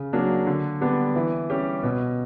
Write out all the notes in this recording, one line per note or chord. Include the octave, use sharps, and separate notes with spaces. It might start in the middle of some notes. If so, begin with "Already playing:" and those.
Already playing: C#3
F#3 A#3 D4
D3
G3 B3 D4
E3
G3 C#4 G4
B2